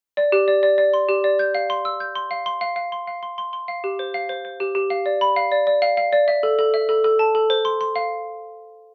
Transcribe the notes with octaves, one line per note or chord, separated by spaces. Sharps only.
D5
G4
D5
D5
D5
C6
G4
D5
G6
F5
C6
E6
G6
C6
F5
C6
F5
F5
C6
F5
C6
C6
C6
F5
G4
C5
F5
C5
C5
G4
G4
F5
D5
B5
F5
D5
D5
F5
F5
D5
E5
A4
A4
E5
A4
A4
A5
A4
C5
C6
C6
F5